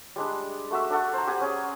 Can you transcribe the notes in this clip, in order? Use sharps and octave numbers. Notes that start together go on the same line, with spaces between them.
G3 G#3 D4
A3 F#4 E5
D4 A4 F#5
C5 A#5
G4 F#5 G#5
C#4 G#4